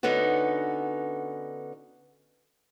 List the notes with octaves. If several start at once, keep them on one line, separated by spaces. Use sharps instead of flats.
D3 B3 C#4 D#4 F#4